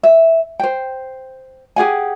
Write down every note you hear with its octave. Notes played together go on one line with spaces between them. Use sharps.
E5
C5 G5
G4 G#4 F#5 G#5